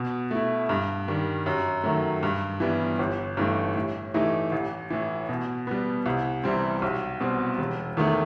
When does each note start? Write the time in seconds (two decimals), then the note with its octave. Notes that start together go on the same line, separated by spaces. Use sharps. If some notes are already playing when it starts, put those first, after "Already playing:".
Already playing: B2
0.31 A3 E4
0.69 G2
1.08 D#3 G3
1.46 F#2
1.83 D#3 F#3 A3
2.23 G2
2.60 E3 G3 B3
2.99 G1
3.37 G2 E3 A3 D#4
3.76 A2
4.14 E3 A3 D#4 G4
4.52 A1
4.90 A2 E3
5.29 B2
5.67 G3 B3
6.06 C2
6.44 C3 E3 G3 C4
6.82 B1
7.20 B2 G3 C4
7.58 E1
7.97 E2 D#3 A3 E4